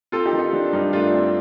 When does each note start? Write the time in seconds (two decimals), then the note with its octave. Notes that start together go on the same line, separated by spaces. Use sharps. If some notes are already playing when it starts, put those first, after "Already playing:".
0.12 C4 F4 A4
0.26 D#4 G4
0.33 D#3
0.39 D#4
0.53 D#3 D4
0.73 G2 D#4
0.93 A3 D4 F4
1.13 C4